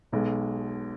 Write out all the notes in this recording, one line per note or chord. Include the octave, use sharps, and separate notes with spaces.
B1 B2 G#3